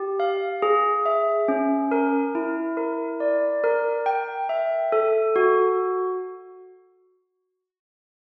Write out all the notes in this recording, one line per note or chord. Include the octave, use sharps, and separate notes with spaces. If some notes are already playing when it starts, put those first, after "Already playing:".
Already playing: G4
F5
G#4
E5
C#4
A#4
E4
A#4
D5
A#4
G5
E5
A4
F#4